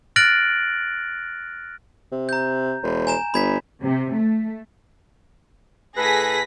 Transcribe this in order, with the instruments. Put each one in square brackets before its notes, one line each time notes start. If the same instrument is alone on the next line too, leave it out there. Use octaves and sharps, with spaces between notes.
[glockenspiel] F6 F#6 A6 A#6 D7 F#7
[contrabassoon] C3
[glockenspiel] A#5 G6
[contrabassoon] E1
[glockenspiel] G#5 A#5 E7
[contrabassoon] G1 [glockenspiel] B5 G#6 B6
[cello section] C3
A3
[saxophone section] A2 A4 B4 [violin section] G#4 A#6 B6